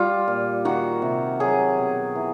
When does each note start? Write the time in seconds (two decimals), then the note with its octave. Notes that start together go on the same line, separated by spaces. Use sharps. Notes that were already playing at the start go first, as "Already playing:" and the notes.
Already playing: G3 F4
0.28 A#2
0.65 D#3 F#4
1.02 C3
1.40 F#3 G#4
1.78 B2
2.15 E3